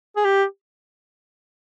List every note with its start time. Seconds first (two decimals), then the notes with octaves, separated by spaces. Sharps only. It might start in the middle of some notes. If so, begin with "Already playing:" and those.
0.17 G#4
0.25 G4